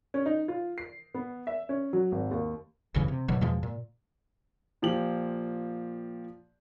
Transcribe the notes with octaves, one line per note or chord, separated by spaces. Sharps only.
C#4
D#4
F4
C7
B3
E5
C#4
F#3
G#1
D#2
F#1 D2 C#3 E3
C3
G#1 B2 D3 F#3
E2 B2 F3 G#3
A#2
A#2 F3 G4 F#7